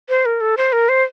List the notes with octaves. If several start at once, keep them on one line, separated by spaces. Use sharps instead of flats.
C5
A#4
A4
C5
A#4
C5